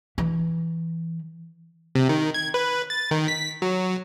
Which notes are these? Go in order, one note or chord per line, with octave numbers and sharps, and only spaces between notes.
E3
C3
D#3
G#6
B4
A6
D#3
B6
F#3